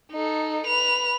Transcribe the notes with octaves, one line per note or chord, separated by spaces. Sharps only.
D#4 A4
B4 F7